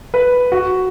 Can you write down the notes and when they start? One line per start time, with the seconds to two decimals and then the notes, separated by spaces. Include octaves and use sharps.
0.14 B4
0.52 F#4